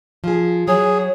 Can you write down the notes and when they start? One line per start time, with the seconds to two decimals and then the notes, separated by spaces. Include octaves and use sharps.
0.24 F3 G#4
0.68 F#3 G#4 C#5